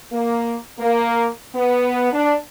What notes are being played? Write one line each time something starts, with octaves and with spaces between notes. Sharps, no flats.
A#3
A#3
B3
D4